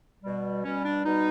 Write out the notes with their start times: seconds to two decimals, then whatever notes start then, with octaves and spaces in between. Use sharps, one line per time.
0.23 B2 G3
0.64 B2 G3 C#4
0.84 D4
1.05 B2 G3 D#4